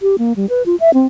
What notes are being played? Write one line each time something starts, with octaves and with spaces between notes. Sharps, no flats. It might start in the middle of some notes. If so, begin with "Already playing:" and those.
G4
A#3
G3
B4
F4
E5
C4